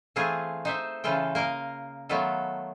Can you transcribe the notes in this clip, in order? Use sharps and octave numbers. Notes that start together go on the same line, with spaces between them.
E3 A3 C4 F4 G#4
D#4 C5 E5
C#3 E3 F4 A4 G5
A#3 A#4 D#5 F5
D#3 F#3 A3 B3 F4 A4